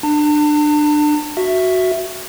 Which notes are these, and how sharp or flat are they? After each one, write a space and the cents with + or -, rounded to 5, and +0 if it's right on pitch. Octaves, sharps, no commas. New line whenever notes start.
D4 +25 A5 +40
F#4 +0 E5 +5